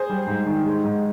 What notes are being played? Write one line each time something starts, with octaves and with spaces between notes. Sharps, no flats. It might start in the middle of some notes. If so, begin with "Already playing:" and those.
Already playing: G#4 C5
G3
G#2
D#3
G#3
G#2